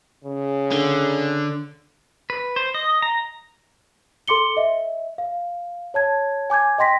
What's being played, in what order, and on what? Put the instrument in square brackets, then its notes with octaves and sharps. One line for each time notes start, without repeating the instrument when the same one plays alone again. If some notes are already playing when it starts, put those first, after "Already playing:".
[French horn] C#3
[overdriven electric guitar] D3
[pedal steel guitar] B4
C5
D#5
A#5
[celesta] A4 C6 D6 C#7 G7
D#5 E5
F5
C#5 A5 G#6
G#5 D6 G6 G#6
D#5 G5 C6 A#6 B6